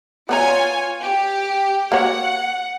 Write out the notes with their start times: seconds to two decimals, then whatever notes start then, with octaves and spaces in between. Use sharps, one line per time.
0.29 B3 F4 B4 C#5 G#5 A#5
1.03 G4
1.92 A#3 F#4 C#5 F#5